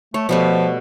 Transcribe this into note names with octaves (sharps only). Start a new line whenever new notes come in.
A3 C#5
B2 F3 G3 A3